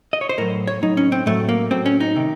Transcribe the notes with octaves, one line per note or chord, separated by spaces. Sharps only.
D#5
C#5
C5
A2 F#3 A#4
C#5
A2 F#3 D#4
C#4
C4
A2 F#3 A3
A#3
A2 F#3 C4
C#4
D#4
C3 D#3